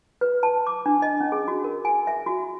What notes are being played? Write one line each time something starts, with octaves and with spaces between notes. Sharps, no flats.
B4
A5
D6
D4
D#5
C#4
G#4
F#4
A#4
G#5
E5
F#4